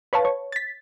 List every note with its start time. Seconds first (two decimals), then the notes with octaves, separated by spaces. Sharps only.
0.13 B4 C#5 F5 A5
0.25 C#5
0.52 A6 B6